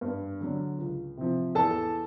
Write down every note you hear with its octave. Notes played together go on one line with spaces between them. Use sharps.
G2
D3 F#3
C#2
C3 F3
E2 A4 A5